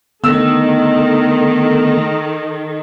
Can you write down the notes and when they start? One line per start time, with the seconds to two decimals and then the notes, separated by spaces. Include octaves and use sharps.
0.24 D3 D#3 A3 B3 A4 E6